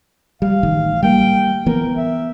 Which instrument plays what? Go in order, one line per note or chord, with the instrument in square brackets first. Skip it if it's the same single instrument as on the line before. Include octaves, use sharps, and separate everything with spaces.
[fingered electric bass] G3 [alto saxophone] F5
[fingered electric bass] A1 D#3
[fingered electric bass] G3 A#3 [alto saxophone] G5
[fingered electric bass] E3 B3 [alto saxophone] A#4
[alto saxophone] E5